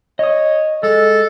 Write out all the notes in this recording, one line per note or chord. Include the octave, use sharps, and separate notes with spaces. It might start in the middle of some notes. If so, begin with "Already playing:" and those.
C#5 D#5 D#6
G#3 A4